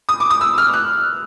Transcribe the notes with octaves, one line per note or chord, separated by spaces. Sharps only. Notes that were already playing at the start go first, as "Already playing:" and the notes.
D#6
D6
D#6
E6
F6
F#6